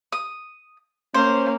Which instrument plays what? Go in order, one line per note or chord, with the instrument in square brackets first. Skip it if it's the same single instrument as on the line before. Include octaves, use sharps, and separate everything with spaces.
[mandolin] D#6
[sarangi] A#3 [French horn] C#4 [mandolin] C5